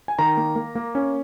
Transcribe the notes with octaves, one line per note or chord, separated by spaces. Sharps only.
G#5
D#3 A#5
A#3
A#3
A#3
C#4